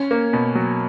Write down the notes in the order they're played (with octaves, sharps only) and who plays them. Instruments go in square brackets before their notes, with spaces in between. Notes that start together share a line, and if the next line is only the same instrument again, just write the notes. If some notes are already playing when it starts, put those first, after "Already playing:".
Already playing: [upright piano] C#4
A#3
B2
F#3